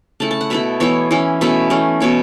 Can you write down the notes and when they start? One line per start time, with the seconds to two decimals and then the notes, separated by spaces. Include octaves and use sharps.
0.20 C#3 A3 E4 A5
0.31 A5
0.41 F#5
0.50 B2 A3 E4 E5
0.80 E3 B3 E4 C#5
1.11 E3 C#4 E4
1.41 B2 A3 C#4 E4 E5
1.70 E3 A3 C#4
2.00 B2 B3 E4 C#5